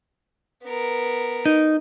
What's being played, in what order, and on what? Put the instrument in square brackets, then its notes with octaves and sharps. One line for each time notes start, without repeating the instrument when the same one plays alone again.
[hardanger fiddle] B3 A#4
[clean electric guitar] D#4